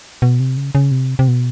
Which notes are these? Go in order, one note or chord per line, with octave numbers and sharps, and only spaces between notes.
B2
C3
C#3
C#3
C3
C3
B2